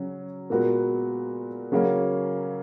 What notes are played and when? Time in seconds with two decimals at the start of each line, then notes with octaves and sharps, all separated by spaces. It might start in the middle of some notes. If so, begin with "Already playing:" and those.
Already playing: C#3 F#3 C#4
0.50 A#2 G#3 B3 F#4 A#4
1.72 C#3 F#3 A#3 C#4